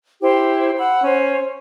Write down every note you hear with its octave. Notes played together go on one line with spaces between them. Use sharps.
E4 G4 C5
F#5 B5 E6
C#4 C5